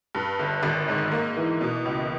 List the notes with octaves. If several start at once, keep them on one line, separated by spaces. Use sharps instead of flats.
G2
G1
G#1
G#2
A#3
E3
B2
C#2